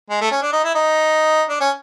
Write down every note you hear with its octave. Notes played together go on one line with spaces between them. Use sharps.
G#3
A3
C#4
D4
D#4
E4
D#4
D4
C#4